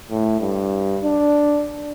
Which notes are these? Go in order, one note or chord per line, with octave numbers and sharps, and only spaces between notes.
A2
G2
D4